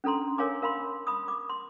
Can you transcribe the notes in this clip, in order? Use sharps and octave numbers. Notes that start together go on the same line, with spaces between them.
C#4 D4 A4 A#5 C6
A#4 C#5 F5 G#5 D6
A#4 F5 B5 C6
B5 D#6
D6
C6